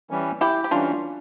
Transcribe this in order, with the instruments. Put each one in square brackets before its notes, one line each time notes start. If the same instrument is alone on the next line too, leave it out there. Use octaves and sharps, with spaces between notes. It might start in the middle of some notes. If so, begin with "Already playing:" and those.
[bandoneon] E3 G3 C#4
[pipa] E4 G4
G4
[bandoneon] E3 G3 C#4 [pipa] D4 F4